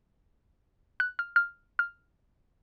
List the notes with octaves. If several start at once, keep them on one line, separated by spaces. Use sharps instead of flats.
F#6
F6
F6
F6